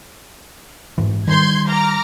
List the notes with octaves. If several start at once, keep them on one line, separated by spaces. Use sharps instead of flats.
G#2 E3
D#3 G3 C6 G6 G#6
A#5 D6 F6